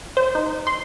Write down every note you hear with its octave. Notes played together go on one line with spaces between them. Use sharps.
C5
D#4
C6